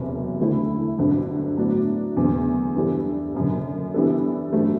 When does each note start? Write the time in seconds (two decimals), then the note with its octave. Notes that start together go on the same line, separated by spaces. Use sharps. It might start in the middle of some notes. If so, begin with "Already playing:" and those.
Already playing: F#1 E2 C3 F#3
0.40 D2 D3 A3 E4
0.98 G1 G2 D3 F#3 C4
1.57 A2 F#3 B3 D4 F#4
2.16 F#1 E2 D3
2.75 G2 E3 G3 D4 A4
3.35 F#1 F#2 D3
3.94 E3 G3 B3 D4 A4
4.53 A1 G2 F#3 A3